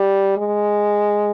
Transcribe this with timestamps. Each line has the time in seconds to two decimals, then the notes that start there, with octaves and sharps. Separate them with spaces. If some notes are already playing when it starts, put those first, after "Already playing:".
Already playing: G3
0.37 G#3